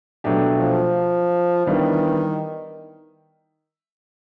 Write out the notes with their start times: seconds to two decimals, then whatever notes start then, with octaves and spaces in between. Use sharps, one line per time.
0.24 B2 F#3 A3 D4 G4
0.60 F3
1.67 D#3 E3 G3 B3 D4